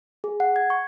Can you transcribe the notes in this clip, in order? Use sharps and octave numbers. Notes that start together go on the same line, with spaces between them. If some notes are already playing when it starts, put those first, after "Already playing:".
G#4
F#5
G#6
C#6